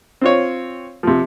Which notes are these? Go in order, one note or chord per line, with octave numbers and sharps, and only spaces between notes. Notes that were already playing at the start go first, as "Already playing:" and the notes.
C4 F4 C#5
C3 F3